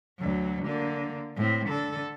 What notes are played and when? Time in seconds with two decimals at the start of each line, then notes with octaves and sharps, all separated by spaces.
0.19 D2 F#3
0.65 D3 A#3
1.36 A2 C4
1.69 D3 A4